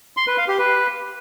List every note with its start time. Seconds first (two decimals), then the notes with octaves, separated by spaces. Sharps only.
0.17 C6
0.27 B4
0.38 F5
0.48 G4
0.58 B4